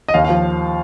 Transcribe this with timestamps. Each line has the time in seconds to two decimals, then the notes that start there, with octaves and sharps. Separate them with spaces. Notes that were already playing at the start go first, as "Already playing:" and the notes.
0.08 D#5
0.14 D#2 F5
0.24 F5
0.29 F3